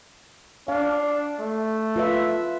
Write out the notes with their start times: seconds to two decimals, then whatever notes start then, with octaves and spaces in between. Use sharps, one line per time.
0.68 D4 F5
1.40 A3
1.96 F4 B4 E5